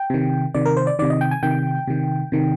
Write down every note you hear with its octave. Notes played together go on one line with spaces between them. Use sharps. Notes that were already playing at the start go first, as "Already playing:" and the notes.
Already playing: G5
C3 D#3
C3 D#3 D5
A#4
C5
D5
C3 D#3 D5
D#5
G5
G#5
C3 D#3 G5
C3 D#3
C3 D#3